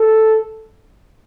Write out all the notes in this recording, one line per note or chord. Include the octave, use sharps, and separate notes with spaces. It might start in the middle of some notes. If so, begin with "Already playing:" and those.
Already playing: A4